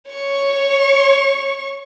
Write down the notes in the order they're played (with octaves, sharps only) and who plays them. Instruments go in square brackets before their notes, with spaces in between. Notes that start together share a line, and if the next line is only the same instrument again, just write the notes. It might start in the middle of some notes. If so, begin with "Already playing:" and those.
[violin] C#5 C#6